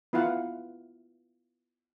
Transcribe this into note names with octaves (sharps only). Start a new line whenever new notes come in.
B3 E4 F4 F5 F#5